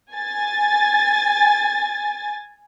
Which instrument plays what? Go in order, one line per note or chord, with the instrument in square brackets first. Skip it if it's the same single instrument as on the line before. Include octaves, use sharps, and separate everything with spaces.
[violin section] G#5 A6